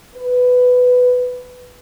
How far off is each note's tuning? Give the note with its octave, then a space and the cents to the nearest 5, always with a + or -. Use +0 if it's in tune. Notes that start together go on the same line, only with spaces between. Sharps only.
B4 +10